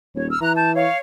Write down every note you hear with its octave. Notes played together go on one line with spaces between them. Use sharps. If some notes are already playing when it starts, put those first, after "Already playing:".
D#1 C#5
E6 F6
E3 A#5 F#6
A5 G6
C#5 F5